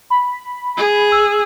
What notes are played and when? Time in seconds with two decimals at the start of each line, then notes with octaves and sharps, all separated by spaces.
0.10 B5
0.77 G#4
1.12 E6